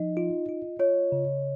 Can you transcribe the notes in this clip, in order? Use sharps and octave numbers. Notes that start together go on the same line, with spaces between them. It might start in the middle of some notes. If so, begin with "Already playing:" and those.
Already playing: F3 D#4 D#5
F4
F4
F4 C#5
C#3